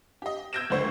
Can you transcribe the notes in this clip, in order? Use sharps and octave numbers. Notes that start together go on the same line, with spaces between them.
G4 D#5
E6 G6 G#6 A#6 D7 E7
F#1 C#2 D3 C5 C#6